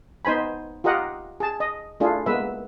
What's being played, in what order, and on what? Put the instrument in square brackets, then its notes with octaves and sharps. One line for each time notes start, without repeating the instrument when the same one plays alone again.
[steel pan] B3 D#4 C5 G#5 B5
F4 G4 A#4 D#5 F#5
G#4 A5
D#5
A3 D4 E4 F4 G#4
G#3 A#3 B3 B4 E5